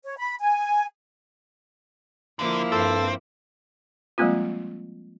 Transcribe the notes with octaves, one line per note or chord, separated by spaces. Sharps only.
C#5
B5
G#5
D3 F3 A#3 E4
G2 C4 A4
F3 G3 G#3 A#3 C4 F4